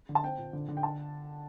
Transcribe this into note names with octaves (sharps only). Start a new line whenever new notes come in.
D3
A5
C4 G5
A#2
D3
D3
G5
A5